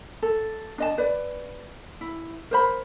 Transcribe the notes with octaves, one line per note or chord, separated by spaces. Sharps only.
A4
D4 D#5 A5
B4 D5
E4
A#4 C5 B5